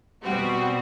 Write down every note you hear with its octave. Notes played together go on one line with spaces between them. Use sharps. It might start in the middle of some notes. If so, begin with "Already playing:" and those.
B2 G3 C4 F#4